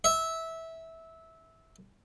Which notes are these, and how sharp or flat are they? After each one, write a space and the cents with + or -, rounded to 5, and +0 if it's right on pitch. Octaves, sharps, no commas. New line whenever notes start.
E5 -15